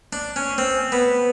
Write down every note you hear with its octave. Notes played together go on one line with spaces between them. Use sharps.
D4
C#4
C4
B3